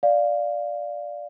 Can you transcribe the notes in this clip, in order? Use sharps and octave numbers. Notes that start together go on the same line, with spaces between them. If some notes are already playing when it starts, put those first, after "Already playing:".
D5 F5